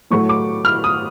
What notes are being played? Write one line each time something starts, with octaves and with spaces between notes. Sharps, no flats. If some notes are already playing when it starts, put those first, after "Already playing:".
A2 F#3 A3 C#6
D6
F6
D#6